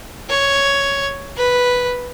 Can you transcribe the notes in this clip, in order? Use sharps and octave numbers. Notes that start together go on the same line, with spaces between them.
C#5
B4